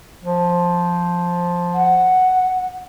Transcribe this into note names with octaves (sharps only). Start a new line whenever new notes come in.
F3
F#5